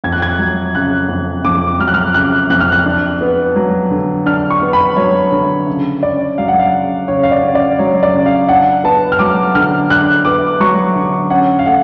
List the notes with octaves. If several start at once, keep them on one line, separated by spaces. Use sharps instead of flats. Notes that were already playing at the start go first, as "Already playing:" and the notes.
F2 G#6
F#6
G#6
F#3
C#3 F#6
F2
F2 D6
F#3 F6
F#6
F6
C#3 F#6
F2 F#6
F6
F#6
D4
B3
F#3
D3
D4 F6
C#6
B3
B5
F#3 C#5
D3
C#3
C#4 D5
F#3 F5
F#5
F5
C#3
C#3 C#5
F5
D5
C#4
D5
F#3 C#5
D5
C#3
F5
D4 F#5
B3 A5
F6
F#3 D6
D3 F6
D4 F#6
B3 D6
F#3 C#6
D3
C#4 F#5
F5
A3 F#5